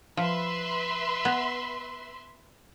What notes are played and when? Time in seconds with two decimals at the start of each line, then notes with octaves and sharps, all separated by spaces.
0.17 F3 B4 E5 C6
1.25 B3